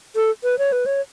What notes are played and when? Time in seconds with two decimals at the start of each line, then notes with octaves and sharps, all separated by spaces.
0.16 A4
0.44 B4
0.59 C#5
0.72 B4
0.86 C#5